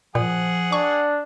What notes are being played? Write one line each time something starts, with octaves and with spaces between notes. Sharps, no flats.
A#2 F3 G#4 F#5
D4 C#6